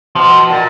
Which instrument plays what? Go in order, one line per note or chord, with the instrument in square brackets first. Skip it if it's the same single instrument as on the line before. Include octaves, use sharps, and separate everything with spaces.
[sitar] B2 [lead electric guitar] F3
[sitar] A#2